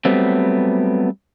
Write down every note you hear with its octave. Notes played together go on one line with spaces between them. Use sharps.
F#3 G3 A3 B3 C4